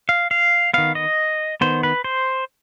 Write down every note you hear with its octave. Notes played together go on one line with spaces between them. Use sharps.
F5
F5
D#3 B3 F5
D#5
D#3 B3 C5
B4
C5